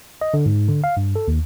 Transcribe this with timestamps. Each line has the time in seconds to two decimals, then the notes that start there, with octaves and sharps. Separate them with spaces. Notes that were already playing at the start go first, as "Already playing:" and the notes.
0.21 D#5
0.34 D3
0.46 G#2
0.68 D3
0.84 F5
0.97 G2
1.16 A4
1.28 D#2